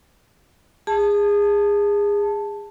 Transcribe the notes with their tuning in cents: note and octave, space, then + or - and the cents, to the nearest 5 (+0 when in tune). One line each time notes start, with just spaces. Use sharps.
G#4 -25 A5 +0